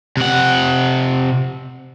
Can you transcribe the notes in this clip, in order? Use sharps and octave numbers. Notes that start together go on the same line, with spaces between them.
C3 F#5